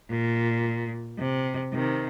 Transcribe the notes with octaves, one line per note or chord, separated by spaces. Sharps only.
A#2
C3
C3 D#3